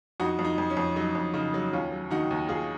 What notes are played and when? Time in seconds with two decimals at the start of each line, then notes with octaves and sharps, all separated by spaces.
0.20 F2 D#4 F#4
0.39 F2
0.44 D#4
0.58 F2
0.70 C#4
0.77 F2
0.96 F#3 D#4
1.15 F2
1.34 C#3 D#4
1.54 F#3
1.73 D#2 C#4 F4
1.92 F#3
2.11 D#3 D#4 F#4
2.31 D#2
2.48 D#2 F4 G#4